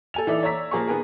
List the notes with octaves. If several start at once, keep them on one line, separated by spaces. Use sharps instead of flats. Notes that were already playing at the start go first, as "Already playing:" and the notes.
A4 G#5 F7
E3 D#4 A4 D5 E5
C#5 D5 A#5 E6 B6
F3 A#3 G#4 A#5 C#6
D#3 B3 G#4 A#4